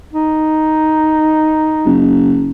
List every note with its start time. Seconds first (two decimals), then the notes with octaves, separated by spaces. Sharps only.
0.13 D#4
1.86 F#1